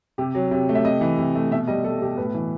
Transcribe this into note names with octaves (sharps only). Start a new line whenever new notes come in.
C3 G4
F#3
C3
A3
E5
C3 D#5
E3
C3
A3
B2 E5
G3 D#5
G3 A4
B2 G4
A2 B4
E3